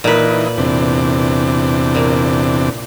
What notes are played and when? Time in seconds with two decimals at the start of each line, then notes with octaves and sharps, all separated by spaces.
0.04 A#2 E3 D#4 B4
0.58 E2 C3 D4
1.95 A#2